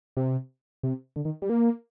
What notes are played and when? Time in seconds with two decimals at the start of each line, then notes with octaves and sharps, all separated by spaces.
0.17 C3
0.83 C3
1.16 D3
1.25 D#3
1.42 G3
1.50 A#3